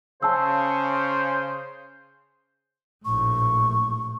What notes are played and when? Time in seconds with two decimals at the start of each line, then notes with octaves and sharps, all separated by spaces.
0.22 C#3 C5 A5 E6
3.05 A#1 A2 C#6